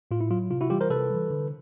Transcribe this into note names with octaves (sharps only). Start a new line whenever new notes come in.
A2 F4
E4
F#3 F4
C3 F4
E4 F#4
E3 G3 F4 G4
A#4 C5
C3 A4 B4
E3 G3
D3